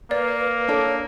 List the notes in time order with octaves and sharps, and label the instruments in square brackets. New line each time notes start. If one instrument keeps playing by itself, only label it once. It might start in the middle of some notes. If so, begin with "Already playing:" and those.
[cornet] A#3 [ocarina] B4 [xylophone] D5
[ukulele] D4 A4 D5 [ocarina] C#5